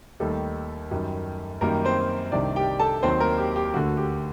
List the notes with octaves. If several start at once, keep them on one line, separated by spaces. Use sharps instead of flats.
D#2 D#3 G3 A3 A4
F#2 D#3 G3
F#2 D#3 G3 A#3 A#4
C4 C5
C2 C3 D#3 D4 D5
G4 G5
A4 A5
D#2 D#3 F#3 C4 C5
A#3 A#4
G4
G4
D2 D3 A3 F#4
G4